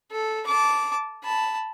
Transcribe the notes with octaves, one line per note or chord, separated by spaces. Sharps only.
A4
A5 D6
A5 B5